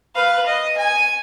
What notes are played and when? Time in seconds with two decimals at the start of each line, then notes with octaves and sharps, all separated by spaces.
0.15 B4 F5
0.46 D#5
0.78 G#5